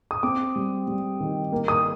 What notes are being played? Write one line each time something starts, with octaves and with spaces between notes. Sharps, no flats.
D#6
C4 D6
G3
G3
D#3
A#3
D#6